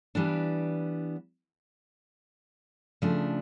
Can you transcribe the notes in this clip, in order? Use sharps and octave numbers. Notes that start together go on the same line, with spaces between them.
E3 G3 B3 D4
C#3 F3 A3 D4